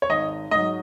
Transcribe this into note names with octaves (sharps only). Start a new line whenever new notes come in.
C#5
G#1 D#5
G#2 F#3 D#5